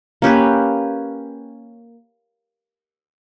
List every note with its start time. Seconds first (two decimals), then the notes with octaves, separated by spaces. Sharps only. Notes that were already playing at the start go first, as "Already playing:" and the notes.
0.22 A#3 C#4 G4 B4